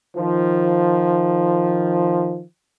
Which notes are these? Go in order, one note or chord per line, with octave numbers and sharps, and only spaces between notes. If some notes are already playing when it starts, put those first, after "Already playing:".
D#3 F3